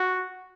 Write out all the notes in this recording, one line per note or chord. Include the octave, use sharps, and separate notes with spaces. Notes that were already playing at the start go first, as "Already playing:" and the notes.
Already playing: F#4